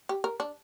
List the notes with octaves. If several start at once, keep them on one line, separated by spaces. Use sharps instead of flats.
G4
A#4
D4